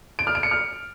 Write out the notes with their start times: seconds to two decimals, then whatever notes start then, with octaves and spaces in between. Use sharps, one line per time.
0.19 D7
0.27 F6
0.35 D7
0.43 C#7
0.51 F6